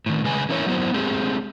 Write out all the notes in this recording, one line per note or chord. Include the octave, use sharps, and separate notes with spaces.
A2 D#3
C#3 G#3 B4 G#5
D3 E3 C#4 E4 A#4 C#5
F#3 A#3 B3 E4 C5
G#3 A3 C4 G4 G#4